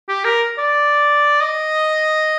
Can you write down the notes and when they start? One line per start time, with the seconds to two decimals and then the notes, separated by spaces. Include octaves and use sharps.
0.09 G4
0.25 A#4
0.58 D5
1.41 D#5